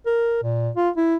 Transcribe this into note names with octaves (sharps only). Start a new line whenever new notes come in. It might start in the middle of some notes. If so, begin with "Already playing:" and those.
A#4
A#2
F4
E4